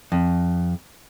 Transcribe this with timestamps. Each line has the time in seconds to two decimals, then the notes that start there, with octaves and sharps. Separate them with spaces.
0.12 F2